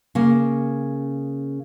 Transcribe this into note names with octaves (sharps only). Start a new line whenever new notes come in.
C#3 A#3